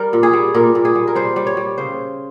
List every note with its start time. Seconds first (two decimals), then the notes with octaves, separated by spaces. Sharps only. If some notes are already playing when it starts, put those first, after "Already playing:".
Already playing: G3 A#4
0.13 A#2
0.23 G#4
0.33 G3
0.54 A#2 A#4
0.75 A#2
0.85 G#4
0.95 G3
1.08 A#4
1.15 G3 C5
1.36 G3
1.47 C#5
1.57 G3
1.78 C#3 C5